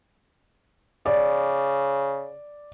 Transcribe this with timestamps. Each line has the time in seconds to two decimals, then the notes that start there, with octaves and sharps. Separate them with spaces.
1.06 C#3 D5